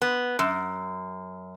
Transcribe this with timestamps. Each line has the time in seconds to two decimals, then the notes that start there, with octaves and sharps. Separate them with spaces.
0.02 B3
0.39 F#2